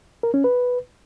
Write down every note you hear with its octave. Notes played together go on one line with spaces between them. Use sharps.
A#4
C#4
B4